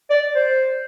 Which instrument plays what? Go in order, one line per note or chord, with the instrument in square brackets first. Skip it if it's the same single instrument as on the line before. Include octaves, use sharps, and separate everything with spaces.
[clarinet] D5
C5